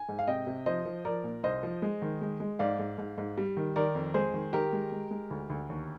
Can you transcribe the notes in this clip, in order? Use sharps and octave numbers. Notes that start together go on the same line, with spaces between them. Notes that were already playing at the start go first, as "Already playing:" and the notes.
Already playing: G#5
G#2
F5
C3 D#5 G5
C3
F3 C5 D#5
F3
F3 A#4 D5
A#2
C2 C5 D#5
F3
G#3
D#3
G#3
G#3
G#2 D5 F5
G#2
G#2
G#2
G3
D#3
D#3 A#4 D5
F2
G#3 G#4 C5
D#3
D#3 G4 A#4
G#3
G#3
G#3
D2
D2
D#2